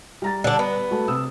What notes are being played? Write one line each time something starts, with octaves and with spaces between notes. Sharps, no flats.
G3 A#5 A6
D3 D4
B3
A3 F#4
C3 D#6 E6